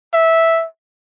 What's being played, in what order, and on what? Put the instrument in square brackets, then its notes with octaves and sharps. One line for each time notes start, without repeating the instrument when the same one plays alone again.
[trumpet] E5